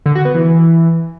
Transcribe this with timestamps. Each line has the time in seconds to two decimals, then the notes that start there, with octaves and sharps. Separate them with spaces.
0.06 D3
0.15 F#4
0.25 B3
0.35 E3